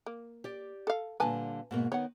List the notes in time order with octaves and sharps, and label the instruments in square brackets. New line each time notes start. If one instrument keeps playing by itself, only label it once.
[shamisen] A#3
[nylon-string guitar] G4 D5
[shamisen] A4 F5
[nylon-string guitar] A#2 D3 G3 [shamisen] B4 G#5 A5
[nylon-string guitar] G#2 B2 A#3
[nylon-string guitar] D#3 B3 [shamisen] C#5 F#5